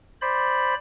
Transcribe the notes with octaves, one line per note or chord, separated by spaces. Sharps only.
C5 D5 B5